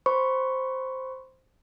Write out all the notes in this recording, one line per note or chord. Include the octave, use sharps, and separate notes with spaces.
C5 B5 C#6